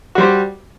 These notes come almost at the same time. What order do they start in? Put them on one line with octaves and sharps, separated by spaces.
F#4 G3 C5 G4